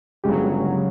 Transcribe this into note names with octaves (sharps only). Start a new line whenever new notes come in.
G1 C#3 F#3 G#3 G4